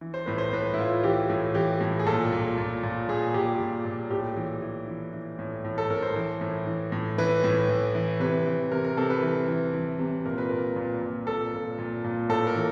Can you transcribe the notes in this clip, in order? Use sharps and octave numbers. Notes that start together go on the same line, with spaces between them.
E3
C5
A2 B4
C5
A2 B4
E4
A2 F4
E3 G4
A2
E3 G4
A2
G#4
A#2 A4
A#2
A#2
A#2
A#2 G#4
A#2 G4
A#2
A#2
A2 G4
E3
E3
E3
E3
A2
A2
A4
A2 A#4
C5
E3
A2
E3
A2
E3 B4
A2
E3
E3
C3 B4
E3
C3 A#4
A#4
C3 A4
B4
E3
E3
E3
C3
A#2 A#4
B4
A#2 A#4
A#2
A#2
A#2 A4
A#2
A#2
A#2
A2 A4
A#4
E3